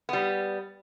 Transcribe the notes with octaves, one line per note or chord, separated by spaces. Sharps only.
G3 B3